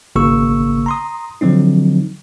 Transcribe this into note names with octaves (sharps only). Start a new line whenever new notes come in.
G#1 C#3 A#3 C#6 E6
A#5 C6 D#6
D3 F3 F#3 C4 D#4